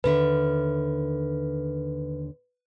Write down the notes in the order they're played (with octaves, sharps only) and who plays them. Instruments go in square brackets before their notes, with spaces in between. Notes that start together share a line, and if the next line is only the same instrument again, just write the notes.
[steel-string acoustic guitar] D#2 D3 E5 [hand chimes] B4